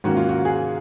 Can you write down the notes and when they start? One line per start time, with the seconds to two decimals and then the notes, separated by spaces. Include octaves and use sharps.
0.04 G#2 D#3 A#3 C#4 F#4
0.17 F4
0.29 F#4
0.45 G#4